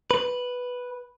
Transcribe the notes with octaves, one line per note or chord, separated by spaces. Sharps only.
B4